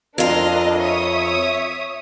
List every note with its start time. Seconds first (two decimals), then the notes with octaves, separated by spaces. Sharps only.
0.18 F2 D4 F4 A#4 D#5
0.80 C#5 E5 D#6